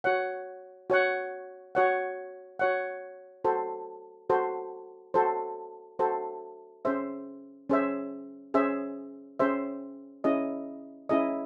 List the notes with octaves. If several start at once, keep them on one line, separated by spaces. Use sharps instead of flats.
F#4 C#5 F#5
F#4 C#5 F#5
F#4 C#5 F#5
F#4 C#5 F#5
F#4 A4 C5
F#4 A4 C5
F#4 A4 C5
F#4 A4 C5
C#4 G#4 C5 E5
C#4 G#4 C5 E5
C#4 G#4 C5 E5
C#4 G#4 C5 E5
C#4 E4 G#4 D#5
C#4 E4 G#4 D#5